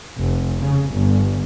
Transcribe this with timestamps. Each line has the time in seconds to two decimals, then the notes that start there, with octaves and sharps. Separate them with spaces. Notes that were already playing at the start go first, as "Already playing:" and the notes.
0.18 F1
0.61 C#3
0.92 G1